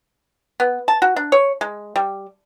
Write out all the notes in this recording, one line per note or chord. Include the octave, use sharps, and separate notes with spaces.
B3
A5
F#4
D4
C#5
G#3
G3